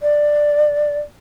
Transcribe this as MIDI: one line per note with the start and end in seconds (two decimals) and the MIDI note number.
0.02 0.97 74